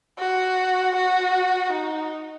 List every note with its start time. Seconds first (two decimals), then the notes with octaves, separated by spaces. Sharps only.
0.19 F#4
0.96 F#4
1.73 D#4